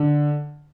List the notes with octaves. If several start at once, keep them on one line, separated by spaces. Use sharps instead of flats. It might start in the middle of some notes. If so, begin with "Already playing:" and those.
Already playing: D3